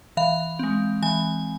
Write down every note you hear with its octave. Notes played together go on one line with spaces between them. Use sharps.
E3 F5
G#3 C4
E3 G#5